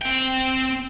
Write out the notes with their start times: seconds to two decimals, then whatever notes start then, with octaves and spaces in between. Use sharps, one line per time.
0.01 C4 G5